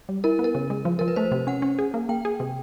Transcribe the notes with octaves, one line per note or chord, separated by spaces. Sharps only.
G3
E4 A#4
B3
A#4
C#3
G#3
F3
F3 A#4
B4
A3 C5
C3
C#4 F#5
C#4
G#4
A#3
A#3 G5
G#4
C3